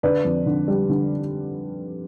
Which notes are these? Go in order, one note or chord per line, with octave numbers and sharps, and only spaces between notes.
D3 B4 D5
F2
D3
G3
D3